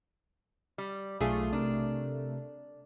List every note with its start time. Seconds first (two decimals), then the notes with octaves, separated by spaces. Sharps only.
0.78 G3
1.21 B1 A3 F4 G#4
1.53 C3 D4 A#4